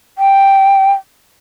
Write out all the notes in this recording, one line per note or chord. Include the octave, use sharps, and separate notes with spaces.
G5